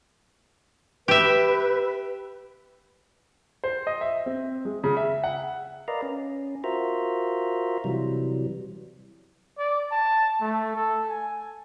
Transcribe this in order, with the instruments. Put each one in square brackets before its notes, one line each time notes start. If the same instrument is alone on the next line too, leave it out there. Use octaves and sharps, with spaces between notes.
[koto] G4 E5 [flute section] B4
[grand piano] C5
D#5
E5
C4
G#3
C#3
E5
F#5
[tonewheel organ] A#4 B4 D5 D#5 F5 A#5
C#4
F4 F#4 A#4 C5 E5 A#5
C3 E3 F#3 G3
[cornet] D5
A5
A3
A4
G#5